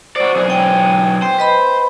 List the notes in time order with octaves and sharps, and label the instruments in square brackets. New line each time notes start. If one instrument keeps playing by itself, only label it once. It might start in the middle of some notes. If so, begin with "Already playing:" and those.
[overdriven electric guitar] F#4 D5 [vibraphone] C5
[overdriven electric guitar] B1 G#4
[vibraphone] G5
[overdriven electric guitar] C5 [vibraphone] G5
[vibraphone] B4 D#5 B5